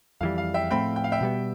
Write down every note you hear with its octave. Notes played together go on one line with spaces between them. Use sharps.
F2 E3 G3 F5
F5
E5 G5
A2 F3 A3 C4 G5 B5
G5
F5
E5 G5
B2 G3 B3